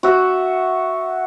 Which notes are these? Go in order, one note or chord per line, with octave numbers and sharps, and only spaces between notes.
F#4 E5